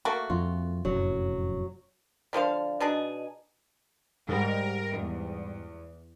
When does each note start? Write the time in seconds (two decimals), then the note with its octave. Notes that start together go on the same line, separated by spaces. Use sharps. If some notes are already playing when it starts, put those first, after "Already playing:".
0.05 A3 A#3 F#4
0.30 F2 F4
0.85 F1 F#2 A2 F#3
2.33 D3 F3 C5 F5
2.80 B2 D4 D#4 G#4
4.29 G#2 G3 A#4
4.98 E2